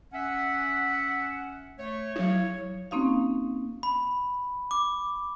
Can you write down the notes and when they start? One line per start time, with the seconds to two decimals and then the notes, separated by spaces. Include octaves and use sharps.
0.12 C#4 E5 F#5
1.79 A3 C#5
2.16 F#3 E4 C#5
2.91 A#3 C4 C#4 D#4 F#4 F5
3.83 B5
4.71 D6